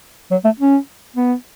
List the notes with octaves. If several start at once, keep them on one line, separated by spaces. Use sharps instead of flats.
F#3
A3
C#4
B3